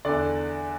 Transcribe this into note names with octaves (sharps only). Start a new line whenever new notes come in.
E2 D3 D5